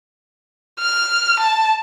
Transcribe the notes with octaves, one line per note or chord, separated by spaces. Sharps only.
F6
A5